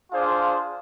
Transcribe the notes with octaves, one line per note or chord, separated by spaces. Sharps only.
D4 F4 G#4 C5 F5